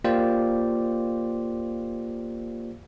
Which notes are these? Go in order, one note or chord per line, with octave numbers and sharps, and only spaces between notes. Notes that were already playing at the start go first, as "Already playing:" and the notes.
A#3 F4 G4 C5 D5